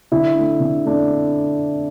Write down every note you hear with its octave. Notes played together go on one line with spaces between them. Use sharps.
D3 E4
A3 D4
D3
A3 D4